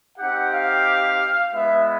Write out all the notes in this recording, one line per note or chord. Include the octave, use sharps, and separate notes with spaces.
C4 D#4 G4 F#5
F5
G#3 B3 E4 E5